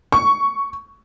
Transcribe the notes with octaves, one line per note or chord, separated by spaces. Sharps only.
C#6